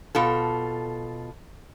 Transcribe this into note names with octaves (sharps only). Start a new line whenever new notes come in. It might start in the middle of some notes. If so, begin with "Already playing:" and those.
B2 F4 A4